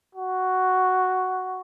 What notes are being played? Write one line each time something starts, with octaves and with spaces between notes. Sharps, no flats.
F#4